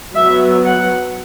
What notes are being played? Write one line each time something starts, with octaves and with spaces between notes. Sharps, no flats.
F#3 B3 E5
F#5